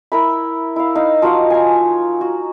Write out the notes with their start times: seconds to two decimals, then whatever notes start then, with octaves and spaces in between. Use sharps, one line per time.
0.12 E4 A#4 B5
0.76 E4 F5
0.95 D#4 F5
1.22 F3 F#3 D#5 F5
1.50 G#5 A#5
2.21 F#4